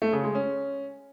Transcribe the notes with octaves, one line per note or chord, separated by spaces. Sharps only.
A3
C#3
G#3
C#4